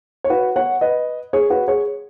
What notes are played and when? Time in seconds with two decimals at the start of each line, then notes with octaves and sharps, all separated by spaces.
0.24 C#5
0.30 F#4 B4
0.56 C#5 F#5
0.81 B4 D#5
1.33 G#4 C#5
1.50 F#4 B4
1.68 G#4 C#5